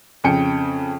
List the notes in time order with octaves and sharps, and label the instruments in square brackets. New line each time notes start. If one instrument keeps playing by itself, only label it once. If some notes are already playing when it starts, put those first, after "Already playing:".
[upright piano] F2 C#3 G5 C#7